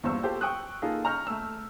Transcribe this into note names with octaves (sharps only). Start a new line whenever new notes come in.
E2 G2 A#2 C5 C#6 E6
F4 G4 A4 C5
G5 C#6 D#6 E6 F#6
A#3 D#4 F4 G#4 A4
D#5 A#5 C#6 F6 G6
A3 E6